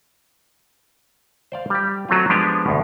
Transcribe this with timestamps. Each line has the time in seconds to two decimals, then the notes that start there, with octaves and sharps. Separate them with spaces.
1.52 C5 D5 F5
1.70 G3 G4
2.09 F#3 A3 C4 F4
2.30 F3 G#3 B3 D4 G4
2.66 D2 G2 B2